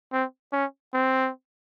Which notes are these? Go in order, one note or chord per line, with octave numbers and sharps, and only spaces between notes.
C4
C#4
C4